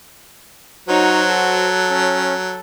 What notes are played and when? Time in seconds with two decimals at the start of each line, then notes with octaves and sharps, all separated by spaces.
0.88 F#3 D#4 F#4 C5 C#5
1.28 A4
1.91 C#4